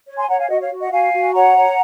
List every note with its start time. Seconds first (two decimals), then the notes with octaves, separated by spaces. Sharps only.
0.06 C#5
0.17 G#5 C6
0.29 C#5 F#5 A#5
0.38 F5 G#5
0.49 F#4 D#5 F#5
0.60 C#5 F5
0.71 F#4
0.81 D#5 F#5
0.91 F#4 F5 G#5
1.13 F#4
1.34 C#5 F#5 A#5
1.56 C#5